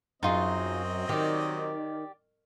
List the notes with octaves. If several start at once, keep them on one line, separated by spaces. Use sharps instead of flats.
F#2 F#3 C4 D#4 F4 G#4 D#5
D#3 G4 D5